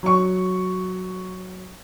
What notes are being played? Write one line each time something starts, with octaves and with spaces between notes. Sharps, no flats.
F#3 C#6